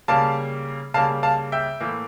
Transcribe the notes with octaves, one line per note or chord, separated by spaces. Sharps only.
C#3 G3 A#3 F5 A5
C#3 G3 A#3 F5 A5
F5 A5
E5 G5
A2 E3 A#3